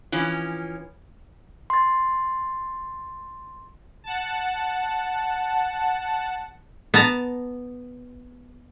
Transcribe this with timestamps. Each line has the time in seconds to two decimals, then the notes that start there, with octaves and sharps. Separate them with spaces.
0.12 E3 F3 C#4
1.70 C6 A6
4.04 F#5 A5
6.94 B3 A5 A#5